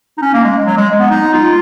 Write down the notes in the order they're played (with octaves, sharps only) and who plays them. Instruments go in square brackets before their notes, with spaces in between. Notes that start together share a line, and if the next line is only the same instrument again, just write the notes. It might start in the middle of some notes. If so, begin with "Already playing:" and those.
[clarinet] D#4
C#4
A#3
G#3
F#3
G#3
B3
D#4
F4